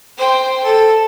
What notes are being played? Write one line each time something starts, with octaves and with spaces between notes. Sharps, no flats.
C5 G5
A4